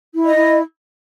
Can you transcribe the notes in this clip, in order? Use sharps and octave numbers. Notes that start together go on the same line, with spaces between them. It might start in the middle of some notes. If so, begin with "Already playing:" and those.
E4
D#5
E4